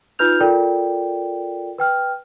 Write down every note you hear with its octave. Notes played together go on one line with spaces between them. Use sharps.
D#4 F4 B4 F6 G6 F7
F4 A4 A#4 D5 G5
B4 G5 F6